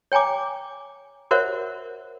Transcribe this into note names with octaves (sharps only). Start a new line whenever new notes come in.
C#5 G5 G#5 A#5 D6
F#4 A#4 C5 C#5 E5 F#5